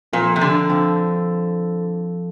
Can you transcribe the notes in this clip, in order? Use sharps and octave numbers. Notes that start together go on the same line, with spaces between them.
A#2 F3 C4 F4 A4
C3
D3
F3 C4 F4 A4